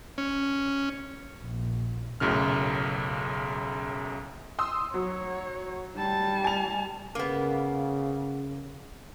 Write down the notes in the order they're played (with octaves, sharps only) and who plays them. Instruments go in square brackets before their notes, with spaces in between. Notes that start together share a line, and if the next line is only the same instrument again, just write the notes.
[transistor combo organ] C#4
[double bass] A#1
[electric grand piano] B1 F#2 A2 C#3 F6
[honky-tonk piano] C6 D#6 E6
[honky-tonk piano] F#3 [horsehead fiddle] C#5
[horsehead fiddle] G3 A5
[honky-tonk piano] G#5 F7
[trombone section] C#3 [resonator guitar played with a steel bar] A#3 B3